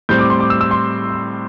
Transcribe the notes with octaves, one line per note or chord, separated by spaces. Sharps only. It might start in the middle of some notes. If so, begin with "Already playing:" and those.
A2 G3 C4 G6
D6
C6
D6
E6
E6
C6